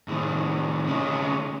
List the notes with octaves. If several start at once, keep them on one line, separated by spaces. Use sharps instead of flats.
A2 D#3
D2 C#4